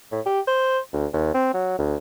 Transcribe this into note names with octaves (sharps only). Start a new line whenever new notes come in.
A2
G4
C5
D2
D#2
C4
F#3
D2